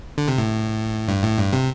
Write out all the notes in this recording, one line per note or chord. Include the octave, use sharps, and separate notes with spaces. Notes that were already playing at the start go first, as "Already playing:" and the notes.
D3
C3
A2
G2
A2
G2
C3